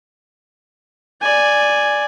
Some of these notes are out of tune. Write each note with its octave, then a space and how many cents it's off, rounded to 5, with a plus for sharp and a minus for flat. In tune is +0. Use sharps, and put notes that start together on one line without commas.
D5 +0 G#5 +0